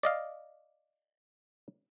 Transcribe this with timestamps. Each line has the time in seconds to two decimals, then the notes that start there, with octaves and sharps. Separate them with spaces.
0.03 D5 D#5 F5